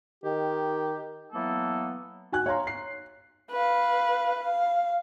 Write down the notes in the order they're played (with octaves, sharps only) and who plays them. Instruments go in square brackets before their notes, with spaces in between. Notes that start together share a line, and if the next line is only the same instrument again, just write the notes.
[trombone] D#3 [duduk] G4
[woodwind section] E3 F#3 A#3 B3 A4
[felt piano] F#4 G#5 F#6
C#5 F5 A#5 C6
C7
[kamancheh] B4 F5
F5